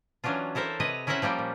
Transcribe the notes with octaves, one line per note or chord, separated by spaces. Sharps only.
E3 F#3 C#4 D4 F4
E4 A4 A#4 C5 E5
C3 B4 C#5 D#5
C#4 E4 A#4 C5 E5 F#5
F3 G3 A#3 G5
A#2